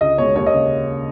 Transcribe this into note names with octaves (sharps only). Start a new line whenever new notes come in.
C#2 D#5
B2 G#3 C#5
D#2 C#5
D#5
C#3